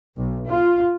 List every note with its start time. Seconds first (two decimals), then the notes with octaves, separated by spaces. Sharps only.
0.17 B1
0.49 F4